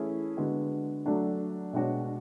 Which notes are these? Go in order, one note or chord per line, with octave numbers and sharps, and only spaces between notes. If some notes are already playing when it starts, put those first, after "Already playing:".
Already playing: E3 A3 C#4 E4 G#4
D3 G#3 B3 F#4
F#3 A3 D4 F#4
B2 G#3 D4 F#4 C#5